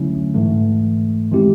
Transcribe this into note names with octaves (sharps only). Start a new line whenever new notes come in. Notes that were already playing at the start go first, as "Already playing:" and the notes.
Already playing: D3 F#3 A3 C#4 E4
G#2 E3 A3
D#3 G#3 C4 E4 G4